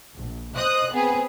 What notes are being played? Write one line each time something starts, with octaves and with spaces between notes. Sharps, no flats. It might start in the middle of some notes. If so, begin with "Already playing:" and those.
A#1
C5 D#5 D#6 F#6
B3 C4 G#4 B4